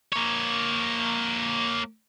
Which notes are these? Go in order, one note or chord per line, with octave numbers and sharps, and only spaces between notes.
A#3 C#5